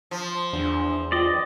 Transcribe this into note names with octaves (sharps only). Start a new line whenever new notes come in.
F3
E2 D4 F5
F4 D5 D#5 G5